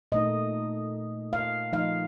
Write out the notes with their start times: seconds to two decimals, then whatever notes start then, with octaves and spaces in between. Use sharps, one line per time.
0.12 A#2 A3 D#4 D#5
1.33 F5
1.73 F3 A3 D#4 F5